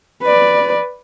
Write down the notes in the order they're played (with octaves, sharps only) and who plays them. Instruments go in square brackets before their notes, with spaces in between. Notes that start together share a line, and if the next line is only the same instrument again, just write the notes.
[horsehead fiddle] B4 D5